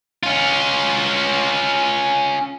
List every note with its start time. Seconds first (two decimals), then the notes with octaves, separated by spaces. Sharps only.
0.23 C#4 F4